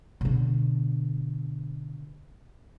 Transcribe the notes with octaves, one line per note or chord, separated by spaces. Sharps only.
B2 D3